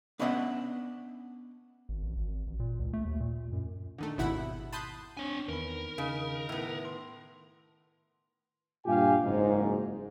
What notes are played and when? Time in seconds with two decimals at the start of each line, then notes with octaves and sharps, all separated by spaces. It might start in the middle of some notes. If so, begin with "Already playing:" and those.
0.19 B3 C#4 D4 D#5 E5 F#5
1.89 G#1
2.03 A1
2.16 G#1
2.47 A1
2.60 A#2
2.80 C#2
2.93 A3
3.05 D#2
3.20 A#2
3.52 F#2
3.98 D3 D#3 A3
4.18 G#1 D#2 B2 E4 F#5 B5
4.73 A5 B5 C6 D#6 F#6 G6
5.17 C4 D4 C#5 G#5
5.49 E2 D#3 A#4 B4 B5
5.98 C#3 D#4 D#5
6.49 A2 B3
6.85 C6
8.85 G2 A#2 F4 G4 F5 G#5
9.22 F#1 G#2